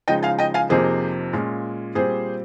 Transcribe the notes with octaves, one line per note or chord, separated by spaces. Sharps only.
C#3 F3 G#3 D#4 D#5 G5
F5 G#5
D#5 G5
F5 G#5
F2 C3 F3 A#3 D#4 G#4 C5
A#2 G#3 C#4 F4
A#2 G3 C4 G#4 C5